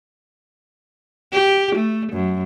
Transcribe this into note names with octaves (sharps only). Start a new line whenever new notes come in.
G4
A3
F#2